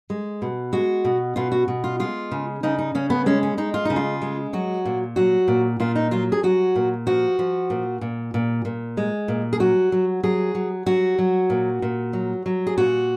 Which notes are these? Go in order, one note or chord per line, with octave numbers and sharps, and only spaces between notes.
G#3
B2
G#3 F#4
B2
B2 F4
F#4
B2
F4
G#3 F4
C#3
C#3 D#4
D#4
C#3 C#4
B3
G#3 C#4
C#4
G#3 D#4
F4
C#3 D#4
F4
G#3
F#3 F#4
A#2
F#3 F#4
A#2
A#2 F4
D#4
F#3 F4
G#4
F#3 F#4
A#2
F3 F#4
F3
A#2
A#2
A#2
A#2
G#3
A#2
G#4
F#3 F#4
F#3
F#3 G#4
F#3
F#3 F#4
F#3
A#2
A#2
F#3
F#3
G#4
A#2 F#4